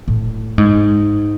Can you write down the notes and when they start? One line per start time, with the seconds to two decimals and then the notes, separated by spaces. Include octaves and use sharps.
0.08 A2
0.58 G#2